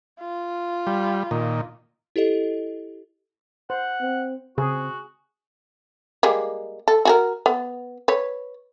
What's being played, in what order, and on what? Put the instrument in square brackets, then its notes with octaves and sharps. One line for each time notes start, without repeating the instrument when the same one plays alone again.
[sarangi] F4
[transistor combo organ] G3
A#2 D#3
[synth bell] E4 G4 A4 D#5
[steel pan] C5 [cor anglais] F#5
[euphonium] C4
[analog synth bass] C#3 [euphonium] C4 [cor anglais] F#4 [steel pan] G#4
[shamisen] G3 G#3 A#3
A4
F#4 G#4 A#4
B3
B4 C#5